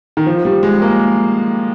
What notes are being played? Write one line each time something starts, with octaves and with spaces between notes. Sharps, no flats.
D#3
F3
G3
G#3
A#3